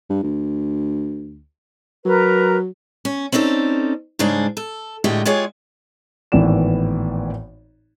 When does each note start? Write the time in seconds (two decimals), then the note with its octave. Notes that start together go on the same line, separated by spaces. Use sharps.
0.10 G2
0.23 D2
2.05 F#3 A#4 B4 A#5
3.05 C#4
3.32 C4 C#4 D#4 A4 D5
4.19 G#2 C#3 G3 G#3 D4
4.57 A4
5.04 A2 D3 G#3 F#4 G4 D#5
5.25 G#3 F4 G4 G#4 C#5
6.32 G#1 A2 E3 B3 D5 E7